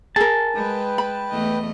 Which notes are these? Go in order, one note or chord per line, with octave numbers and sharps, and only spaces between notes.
G#4 A#4 A5
G#3 B4 G5
B5
E2 A3 D#5